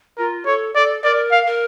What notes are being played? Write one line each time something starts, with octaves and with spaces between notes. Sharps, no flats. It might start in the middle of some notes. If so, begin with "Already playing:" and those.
F4 A#4
A4 C#5
A4 D5
A#4 D5
F5
A#4